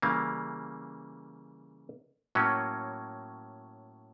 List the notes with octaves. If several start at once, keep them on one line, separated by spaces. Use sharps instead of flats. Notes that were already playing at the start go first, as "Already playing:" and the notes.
C#3 E3 G3 A#3
A2 F#3 A#3 C#4